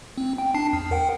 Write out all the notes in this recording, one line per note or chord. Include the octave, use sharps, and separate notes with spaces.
C4
G5
D4 A5 C7
E2
A#4 F#5 G5